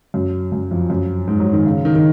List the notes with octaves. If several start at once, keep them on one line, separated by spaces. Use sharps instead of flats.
F#2
F#2
F2
F#2
G#2
F#3
D#3
C#3
D#3
D#3